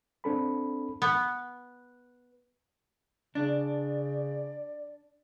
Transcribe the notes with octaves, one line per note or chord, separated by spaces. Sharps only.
C4 D4 A4 B5
B3
C#3 D4 D5